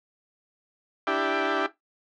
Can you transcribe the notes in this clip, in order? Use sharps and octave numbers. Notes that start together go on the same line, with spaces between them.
D4 E4 G4